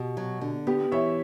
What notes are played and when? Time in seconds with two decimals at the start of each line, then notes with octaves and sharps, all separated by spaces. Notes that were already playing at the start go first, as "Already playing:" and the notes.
Already playing: B2 G4
0.17 F#3
0.41 D3
0.67 B3 G4
0.92 E3 C#5 E5